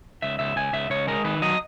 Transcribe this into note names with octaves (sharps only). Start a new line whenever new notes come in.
C#2 E5
C#2 E5
C#2 G#5
C#2 E5
C#2 C#5
G#3 A#4
D#3 B4
F#3 D#5